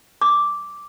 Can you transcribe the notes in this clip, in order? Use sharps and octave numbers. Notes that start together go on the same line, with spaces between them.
D6